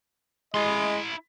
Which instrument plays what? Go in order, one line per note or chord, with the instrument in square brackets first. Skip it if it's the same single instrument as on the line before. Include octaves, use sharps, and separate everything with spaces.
[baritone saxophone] G#3 [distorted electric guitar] E4 C6 [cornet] D#5